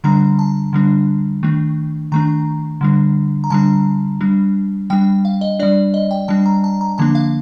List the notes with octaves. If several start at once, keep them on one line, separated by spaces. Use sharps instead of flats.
D3 G3 D4 A#5
A5
D3 G3 D4
D#3 A3 D4
D#3 A3 D4 A#5
D3 G3 D4
A#5
D3 G3 D4 A5
G3 D4
G3 D4 G5
F5
D#5
G3 D4 D5
D#5
G5
G3 D4 A5
A#5
A5
A#5
D3 F3 A#3 D4 A5
F5